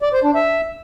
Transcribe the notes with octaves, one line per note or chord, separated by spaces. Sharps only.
D5
C5
D4
E5